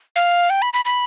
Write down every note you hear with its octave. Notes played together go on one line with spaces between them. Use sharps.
F5
G5
B5
B5
B5